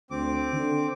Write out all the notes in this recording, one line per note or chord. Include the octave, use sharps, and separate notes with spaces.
D2 C4 D6
D3